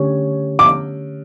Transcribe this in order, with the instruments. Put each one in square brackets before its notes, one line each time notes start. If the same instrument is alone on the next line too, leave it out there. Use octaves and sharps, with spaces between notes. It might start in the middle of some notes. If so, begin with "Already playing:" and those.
Already playing: [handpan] D3 A3 C#4 G4 C#5
[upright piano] D6